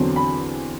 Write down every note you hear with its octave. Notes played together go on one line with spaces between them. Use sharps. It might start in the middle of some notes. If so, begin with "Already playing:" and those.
Already playing: E2 D3 F#3 C4
B5